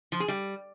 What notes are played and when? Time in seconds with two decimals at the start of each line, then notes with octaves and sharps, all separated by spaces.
0.12 F3
0.20 G#4
0.28 G3